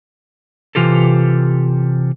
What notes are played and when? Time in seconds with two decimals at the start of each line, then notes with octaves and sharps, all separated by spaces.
0.75 C3 E3 F4 G4 A4